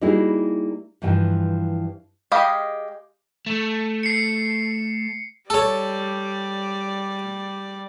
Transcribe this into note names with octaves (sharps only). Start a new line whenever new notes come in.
G3 A#3 D#4 E4 F#4 G#4
G2 E3 F3 G5 G#5
G#3 G4 D#5 F5 B5
A3
C7 C#7
G3 A4 C#5 D5